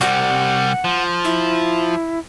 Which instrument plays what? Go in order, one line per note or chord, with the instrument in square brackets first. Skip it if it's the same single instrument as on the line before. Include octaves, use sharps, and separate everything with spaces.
[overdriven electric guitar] C2 G3 [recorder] F#5
[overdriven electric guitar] F3
[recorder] E4